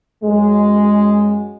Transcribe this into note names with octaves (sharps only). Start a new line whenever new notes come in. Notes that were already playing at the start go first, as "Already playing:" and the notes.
F#2 G#3